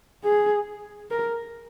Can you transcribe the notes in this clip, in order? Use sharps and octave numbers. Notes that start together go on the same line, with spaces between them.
G#4
A#4